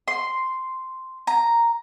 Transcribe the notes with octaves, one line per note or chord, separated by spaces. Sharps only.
C6
A#5